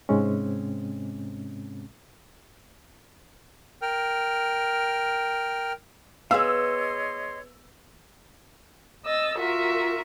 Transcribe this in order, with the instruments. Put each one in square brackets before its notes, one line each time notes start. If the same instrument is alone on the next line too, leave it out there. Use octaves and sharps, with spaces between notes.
[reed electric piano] G#2 C3 G#3 C4 C#4
[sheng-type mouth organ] A#4 G5 F6
[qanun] B3 B4 [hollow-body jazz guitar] G#4 F5 [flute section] C#5 D#5 C6 [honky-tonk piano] E6
[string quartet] D#5 E6 A6
F4 F#4 A#4 E5